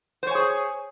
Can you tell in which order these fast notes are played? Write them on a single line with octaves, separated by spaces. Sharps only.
C5 C#5 G#5 G#4